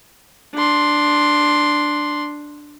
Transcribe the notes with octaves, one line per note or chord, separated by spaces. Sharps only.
D4 C6